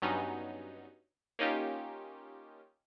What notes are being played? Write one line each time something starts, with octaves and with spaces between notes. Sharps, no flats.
G2 F#3 B3 C#4 D#4
A#3 C#4 D#4 F4 G4